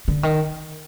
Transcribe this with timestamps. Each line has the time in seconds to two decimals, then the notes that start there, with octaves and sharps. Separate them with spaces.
0.08 D3
0.23 D#3